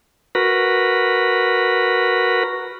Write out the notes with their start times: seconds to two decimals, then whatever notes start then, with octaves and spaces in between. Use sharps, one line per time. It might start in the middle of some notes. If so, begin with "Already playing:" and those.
0.35 F#4 A#4 B4